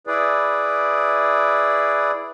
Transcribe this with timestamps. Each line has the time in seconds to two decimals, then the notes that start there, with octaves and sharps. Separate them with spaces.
0.07 E4 G#4 B4 D5